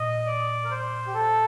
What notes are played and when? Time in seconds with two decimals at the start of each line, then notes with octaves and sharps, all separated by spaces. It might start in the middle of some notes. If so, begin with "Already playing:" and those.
Already playing: A#2 D#5
0.26 D5
0.65 A#4
0.71 C5
1.07 G4
1.14 A4